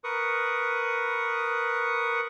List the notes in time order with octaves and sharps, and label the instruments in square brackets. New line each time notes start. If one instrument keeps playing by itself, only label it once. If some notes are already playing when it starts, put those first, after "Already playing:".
[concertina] A#4 B4 C#6 D#6